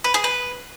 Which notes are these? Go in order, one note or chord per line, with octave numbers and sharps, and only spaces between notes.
B4
G#4
B4